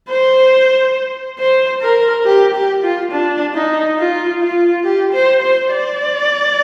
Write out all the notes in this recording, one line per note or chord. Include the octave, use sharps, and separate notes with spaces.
C5
C5
A#4
G4
G4
F4
D4
D#4
F4
F4
G4
C5
C5
D5